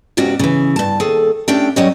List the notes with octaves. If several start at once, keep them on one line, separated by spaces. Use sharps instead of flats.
E2 G#2 C#3 F#4 G4
C#3 E3
G2 A5
D#2 G#4 A4
A2 C#4 D4 G4 E5 G5
F#3 G3 C#4 G4 C#5 D#5